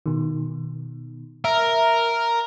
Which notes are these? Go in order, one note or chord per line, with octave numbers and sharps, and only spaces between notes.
B2 D#3
A#4 E5